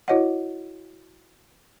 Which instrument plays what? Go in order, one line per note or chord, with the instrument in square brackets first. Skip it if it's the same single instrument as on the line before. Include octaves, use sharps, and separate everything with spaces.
[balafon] E4 F#4 C#5 D#5 F#5